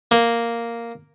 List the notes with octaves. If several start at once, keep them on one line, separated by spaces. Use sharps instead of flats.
A#3